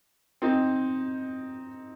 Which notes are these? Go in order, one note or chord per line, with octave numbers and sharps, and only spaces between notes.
C4 D#4